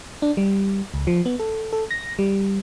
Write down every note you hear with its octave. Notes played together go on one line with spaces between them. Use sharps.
D4
G3
C#2
F3
B3
A4
A4
A#6
G3